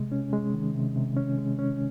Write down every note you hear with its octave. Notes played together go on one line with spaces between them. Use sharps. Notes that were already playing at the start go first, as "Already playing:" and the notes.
Already playing: C3 G#3
C#4
G#3
D#3
C3
C3
C#4
G#3
C#4